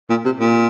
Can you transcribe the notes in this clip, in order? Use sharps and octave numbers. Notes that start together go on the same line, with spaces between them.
A#2
C3
A#2